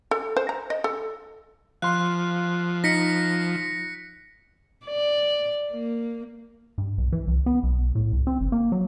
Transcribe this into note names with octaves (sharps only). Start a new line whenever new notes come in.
A4
C5
A#5
D#5
A4
F3 F5 C6 F#6
D#4 A#6 B6 C#7
D5
A#3
G2
B1
E3
C2
B3
B1
A2
C2
C4
G1
A#3
F#3